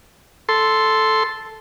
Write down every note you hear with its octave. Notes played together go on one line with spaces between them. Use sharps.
A4 C6